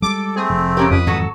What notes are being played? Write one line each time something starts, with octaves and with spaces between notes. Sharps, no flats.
G3 G#3 A4 D6
A3 C4 G#4
F1
C#3 C#4 G4 A#4
F2 B4 D#6
G#1 E2 F#3 F#4 A4